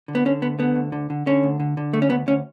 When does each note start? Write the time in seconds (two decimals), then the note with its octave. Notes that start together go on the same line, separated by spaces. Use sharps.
0.08 D3
0.15 B3
0.25 D3 C#4
0.42 D2 B3
0.59 D3 B3
0.76 D2
0.92 D3
1.10 D3
1.26 D3 C#4
1.43 D2
1.60 D3
1.77 D3
1.93 D2 A3
2.02 C#4
2.10 D2 B3
2.27 D2 C#4